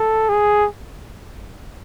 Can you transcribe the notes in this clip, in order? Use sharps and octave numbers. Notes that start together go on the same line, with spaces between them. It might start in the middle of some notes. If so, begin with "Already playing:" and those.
Already playing: A4
G#4